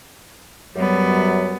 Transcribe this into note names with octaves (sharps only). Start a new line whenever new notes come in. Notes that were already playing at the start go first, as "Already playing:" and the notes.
F#2 F#3 G3 B3